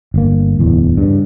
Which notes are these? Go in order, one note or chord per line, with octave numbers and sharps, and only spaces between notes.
G1 A#3
D1 E2
G2 C#3